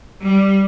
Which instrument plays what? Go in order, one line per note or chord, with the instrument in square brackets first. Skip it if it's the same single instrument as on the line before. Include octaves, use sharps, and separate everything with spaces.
[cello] G3